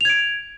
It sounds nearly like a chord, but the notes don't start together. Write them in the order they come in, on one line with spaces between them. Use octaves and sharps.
F7 G#6 D7